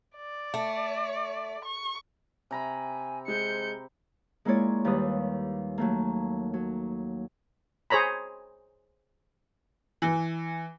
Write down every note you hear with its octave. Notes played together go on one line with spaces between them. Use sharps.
D5
A3
C#6
C3 G#5 A#5 B5
G#3 C5 G6 C#7
G#3 A#3 E4 F4 C#5 D5
D#2 G3 B4 D#6
F#3 A3 A#3
F#3
G#4 C5 C#5 A#5 B5
E3